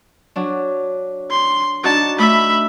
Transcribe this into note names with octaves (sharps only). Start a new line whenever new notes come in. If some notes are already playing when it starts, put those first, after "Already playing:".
F#3 D4
C6
D4 D#4 F#4 A5
A3 E5 B5